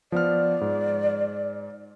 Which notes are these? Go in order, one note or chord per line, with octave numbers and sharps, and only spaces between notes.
F3 B3 D5 F6
G#2